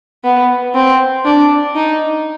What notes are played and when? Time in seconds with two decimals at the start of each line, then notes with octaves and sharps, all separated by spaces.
0.24 B3
0.74 C4
1.25 D4
1.75 D#4